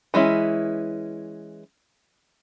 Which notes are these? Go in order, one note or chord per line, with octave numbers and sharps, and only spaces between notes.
E3 G#3 C#4 E4